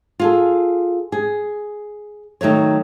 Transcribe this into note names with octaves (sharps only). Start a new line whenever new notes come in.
F4 G#4 A4
G#4
D#3 F#3 A3 C#5